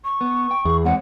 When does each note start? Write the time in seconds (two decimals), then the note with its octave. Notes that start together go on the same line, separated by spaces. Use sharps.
0.04 C#6
0.21 B3
0.51 G5
0.65 E2 G#4
0.85 G#3 C4 C#5 F#5